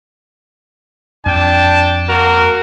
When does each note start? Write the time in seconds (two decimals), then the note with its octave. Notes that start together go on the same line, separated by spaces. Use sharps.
1.26 F2 D4 G5 A5
2.08 A#3 F#4 A#4